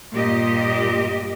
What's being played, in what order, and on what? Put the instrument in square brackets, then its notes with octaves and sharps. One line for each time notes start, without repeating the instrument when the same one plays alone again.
[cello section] G2 A#2 G4 D#5